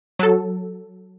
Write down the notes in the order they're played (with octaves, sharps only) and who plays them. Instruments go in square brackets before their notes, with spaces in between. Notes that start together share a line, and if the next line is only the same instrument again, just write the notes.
[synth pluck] F#3 A4